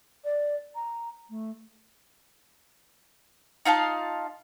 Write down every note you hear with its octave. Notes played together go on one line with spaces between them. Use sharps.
D5
A#5
A3
D#4 F4 F5 A5